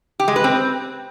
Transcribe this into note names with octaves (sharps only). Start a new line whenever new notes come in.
G4
G#3
B4
C4